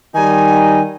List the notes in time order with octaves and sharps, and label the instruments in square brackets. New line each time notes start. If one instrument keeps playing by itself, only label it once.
[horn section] D#3 G3 D#4 [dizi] G#5